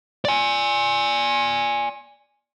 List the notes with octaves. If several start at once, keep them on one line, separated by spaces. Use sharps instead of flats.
D5 G#5